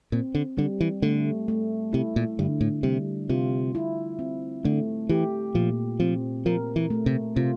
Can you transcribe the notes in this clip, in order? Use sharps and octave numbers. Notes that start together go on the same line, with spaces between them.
A#2 C4
D3
D3 G3
E3
D3 A3
A3
C3 E4
A#2
G2 D3
A2
C3 G3
C3 F4
E4
C4
D3 A3
E3 G4
A#2 F3
F3 C4
F3 A#4
E3
A3
C3
C3 F4